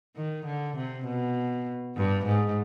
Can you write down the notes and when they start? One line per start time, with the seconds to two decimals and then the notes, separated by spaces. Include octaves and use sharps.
0.17 D#3
0.46 D3
0.77 C3
1.06 B2
1.97 G2
2.26 G#2